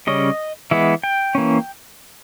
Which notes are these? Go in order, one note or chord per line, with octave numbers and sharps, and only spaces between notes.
C#3 G3 C#4 D#5
E3 G#3 B3 E5
G5
E3 A#3 C#4